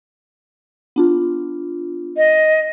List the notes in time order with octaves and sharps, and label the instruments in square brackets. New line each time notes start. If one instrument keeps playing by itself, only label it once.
[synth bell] B3 D4 F4
[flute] D#5